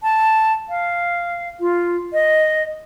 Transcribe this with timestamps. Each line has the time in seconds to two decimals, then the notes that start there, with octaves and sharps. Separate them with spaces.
0.03 A5
0.69 F5
1.60 F4
2.13 D#5